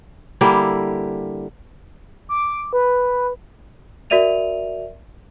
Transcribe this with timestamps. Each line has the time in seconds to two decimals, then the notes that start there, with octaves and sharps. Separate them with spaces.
0.41 D3 G3 A#3 E4
2.29 D6
2.73 B4
4.10 F#4 A#4 D5 E5 D#7 F7